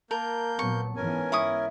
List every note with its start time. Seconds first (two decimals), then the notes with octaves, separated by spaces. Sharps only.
0.11 A#3 A#4 A5 G6
0.59 A#2 F#3 B3 C#6
0.96 G#2 E3 B3 C#4 A#4 G#5
1.32 E4 E5 C#6 D#6